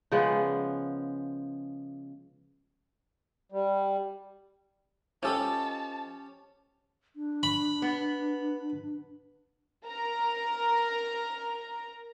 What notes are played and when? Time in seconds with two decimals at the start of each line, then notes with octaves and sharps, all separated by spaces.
0.12 C#3 F3 G#3 B3
3.52 G3
5.23 F3 C#4 G4 A4 D#5 A5 B5
7.16 D4
7.43 B5
7.82 B3
9.86 A#4 A#5